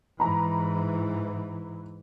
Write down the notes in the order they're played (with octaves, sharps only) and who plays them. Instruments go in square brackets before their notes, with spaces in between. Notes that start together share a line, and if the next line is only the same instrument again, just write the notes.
[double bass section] G#2 E3 [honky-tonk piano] A#5 B5